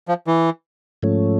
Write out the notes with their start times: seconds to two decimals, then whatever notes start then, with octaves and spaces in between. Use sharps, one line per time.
0.08 F3
0.27 E3
1.03 G#2 F3 A3 C#4